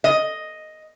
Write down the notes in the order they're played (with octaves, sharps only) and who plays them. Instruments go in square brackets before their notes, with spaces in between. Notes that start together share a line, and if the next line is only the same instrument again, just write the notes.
[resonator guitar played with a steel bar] D#5